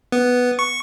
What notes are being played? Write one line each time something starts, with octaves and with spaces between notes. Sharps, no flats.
B3
C#6